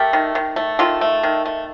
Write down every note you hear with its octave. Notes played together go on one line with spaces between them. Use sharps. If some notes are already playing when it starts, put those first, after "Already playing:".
Already playing: A3 G4 A#4
D#3
D#3
A3
D#3 F4 A4
A3
D#3
A3